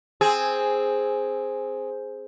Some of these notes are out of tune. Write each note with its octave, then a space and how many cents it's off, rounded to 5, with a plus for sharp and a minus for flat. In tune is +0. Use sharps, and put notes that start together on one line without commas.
C4 +0 G#4 +0